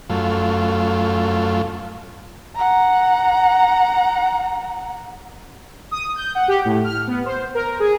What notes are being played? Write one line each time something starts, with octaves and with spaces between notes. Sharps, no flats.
F#2 A3 F4
F#5 A#5
D#6
G6
F#5
G4
A2
F6
B3
C5
A#4
G#4